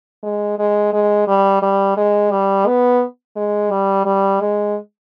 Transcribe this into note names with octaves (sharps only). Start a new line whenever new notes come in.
G#3
G#3
G#3
G3
G3
G#3
G3
B3
G#3
G3
G3
G#3